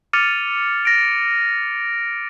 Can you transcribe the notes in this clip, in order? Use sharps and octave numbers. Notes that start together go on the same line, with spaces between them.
D6 F6 A6 C#7 D#7 F7
A#6 D7